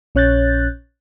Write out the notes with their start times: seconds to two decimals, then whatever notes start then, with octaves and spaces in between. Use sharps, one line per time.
0.15 A#1 C#4 C#5 F#6 G6 A6